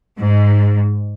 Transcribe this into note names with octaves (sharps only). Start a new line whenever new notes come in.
G#2